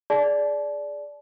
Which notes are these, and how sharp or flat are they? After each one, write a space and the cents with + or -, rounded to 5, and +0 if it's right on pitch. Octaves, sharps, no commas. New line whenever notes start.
G#4 +5 D5 -10 A5 -35